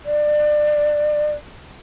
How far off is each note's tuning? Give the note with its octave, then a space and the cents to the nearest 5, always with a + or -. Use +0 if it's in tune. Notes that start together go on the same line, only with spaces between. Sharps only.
D5 +25